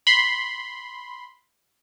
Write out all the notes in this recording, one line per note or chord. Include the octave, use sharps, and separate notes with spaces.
B5 C6